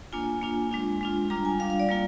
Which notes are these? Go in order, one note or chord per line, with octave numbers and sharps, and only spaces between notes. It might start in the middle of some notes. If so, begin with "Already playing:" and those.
A#3 D4 F4 G#5
A#3 D4 F4
G#3 D4 F4
G#3 D4 F4
G3 D4 F4 A#5
G#5
G3 D4 F4 F5
F5
D5
G3 A#3 F4